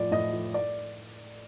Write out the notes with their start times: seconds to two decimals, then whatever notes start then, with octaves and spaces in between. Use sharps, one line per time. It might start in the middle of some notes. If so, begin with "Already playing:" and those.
Already playing: A2 F3 D5
0.11 A2 D#5
0.33 F3
0.54 D5